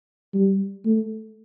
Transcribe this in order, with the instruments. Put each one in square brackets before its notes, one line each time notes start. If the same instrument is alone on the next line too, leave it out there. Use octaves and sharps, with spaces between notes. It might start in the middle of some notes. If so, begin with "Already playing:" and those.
[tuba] G3
A3